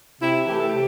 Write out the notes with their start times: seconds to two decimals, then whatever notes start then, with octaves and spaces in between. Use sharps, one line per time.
0.21 C3 E4
0.46 E3 A3 G4
0.58 A4
0.70 C3 G4